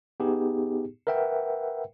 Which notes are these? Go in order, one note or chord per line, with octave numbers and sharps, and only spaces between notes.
B3 D#4 G4 G#4
A#4 B4 E5 F#5 G5